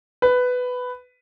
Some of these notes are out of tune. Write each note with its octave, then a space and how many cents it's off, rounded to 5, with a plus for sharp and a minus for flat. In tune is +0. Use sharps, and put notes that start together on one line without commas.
B4 +10